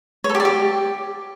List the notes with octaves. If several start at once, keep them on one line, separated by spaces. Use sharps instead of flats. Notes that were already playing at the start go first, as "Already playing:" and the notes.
C#5
A4
G4
D5
G4